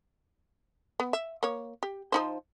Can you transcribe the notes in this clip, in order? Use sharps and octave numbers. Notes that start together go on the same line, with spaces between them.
B3
E5
A#3 C#5
G4
F3 D#4 C5